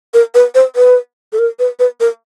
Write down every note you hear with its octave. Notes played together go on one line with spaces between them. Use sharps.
A#4
B4
C5
B4
A4
A#4
B4
B4
A#4